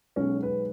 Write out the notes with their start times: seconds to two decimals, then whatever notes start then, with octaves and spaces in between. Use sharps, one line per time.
0.16 B1 B2 G#3 C#4
0.43 B4